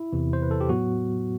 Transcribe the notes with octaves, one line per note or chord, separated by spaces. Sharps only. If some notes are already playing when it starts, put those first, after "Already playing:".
Already playing: E4
E2 C3 E3
C5
B4
A4
G4
A2 F#3 B3 F#4